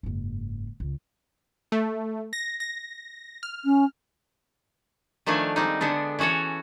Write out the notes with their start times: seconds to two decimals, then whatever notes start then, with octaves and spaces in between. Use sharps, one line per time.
0.03 F#1 G#2
0.80 C#2
1.72 A3
2.33 A#6
2.60 A#6
3.43 F6
3.65 C#4
5.26 D#3 F3 A3 D4 F5 G#5
5.56 G3 G#3 C4 D#4
5.81 D3 G#3 B3 D4
6.19 E3 C#4 F#4 A4 C#5